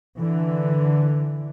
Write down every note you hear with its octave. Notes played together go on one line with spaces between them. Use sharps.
D3 E3